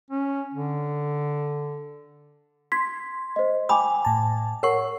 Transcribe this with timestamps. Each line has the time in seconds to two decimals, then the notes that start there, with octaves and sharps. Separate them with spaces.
0.10 C#4
0.54 D3
2.72 C6 G#6 B6
3.36 C5 D#5
3.69 G5 G#5 B5 D6 D#6
4.05 A2 A5
4.63 A#4 C#5 F#5 C#6